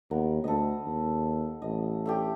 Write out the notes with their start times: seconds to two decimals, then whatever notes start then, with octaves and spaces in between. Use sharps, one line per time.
0.11 D#2 B3 A#4
0.44 D2 A4 B4 D#5
0.86 D#2
1.62 A1 D#5
2.06 A3 D4 G4